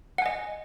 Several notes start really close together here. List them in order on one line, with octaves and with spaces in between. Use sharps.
F#5 G#5 D#5